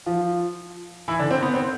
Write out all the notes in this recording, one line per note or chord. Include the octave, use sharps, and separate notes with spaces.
F3 F4
E3 E4
D3 D4
C4
B3
C4